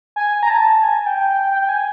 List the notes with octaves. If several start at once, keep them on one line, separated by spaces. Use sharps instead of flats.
G#5
A#5
A5
G#5
G5
G5
G5
G5
G#5